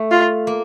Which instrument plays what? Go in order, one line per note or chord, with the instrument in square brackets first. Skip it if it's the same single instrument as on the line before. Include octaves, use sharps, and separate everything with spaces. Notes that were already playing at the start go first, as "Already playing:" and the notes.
Already playing: [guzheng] A3
[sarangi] F4
[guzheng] A#3